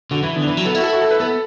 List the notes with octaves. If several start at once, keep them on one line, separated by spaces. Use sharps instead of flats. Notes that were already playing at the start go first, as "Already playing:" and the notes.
D3 F#4
E3 E4
D3 B3
D4
E3 E4
F#3
B3 A4
E4 F#4
A4
F#4
A4
B4
B3 A4